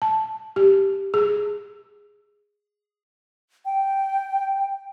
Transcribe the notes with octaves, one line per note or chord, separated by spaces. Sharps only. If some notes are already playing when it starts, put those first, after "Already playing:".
A5
G4
G#4
G5